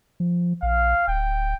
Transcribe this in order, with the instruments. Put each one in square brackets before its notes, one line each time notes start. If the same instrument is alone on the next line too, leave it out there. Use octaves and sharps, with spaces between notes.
[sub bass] F3
[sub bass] A#1 [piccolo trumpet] F5
[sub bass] D1 [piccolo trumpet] G5